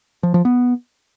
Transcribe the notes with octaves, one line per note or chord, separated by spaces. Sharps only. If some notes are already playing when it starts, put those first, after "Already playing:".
F3
F3
B3